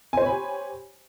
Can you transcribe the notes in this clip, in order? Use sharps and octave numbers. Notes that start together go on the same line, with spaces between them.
G4 C5 C#5 G#5 B5